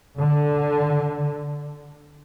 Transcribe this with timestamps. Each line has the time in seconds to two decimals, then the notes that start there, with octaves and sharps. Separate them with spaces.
0.19 D3